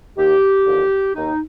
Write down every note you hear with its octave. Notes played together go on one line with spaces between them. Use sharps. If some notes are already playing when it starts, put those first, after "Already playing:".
D#2 D#3 G4
D#2 D3 F3
D#2 D#3 D#4